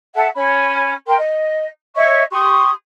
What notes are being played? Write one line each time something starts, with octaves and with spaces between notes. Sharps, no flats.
A4 E5 F#5 A5
C#4 B5
A#4 G5 C6
D#5
C#5 D#5 E5 C#6
G4 C6 C#6 D#6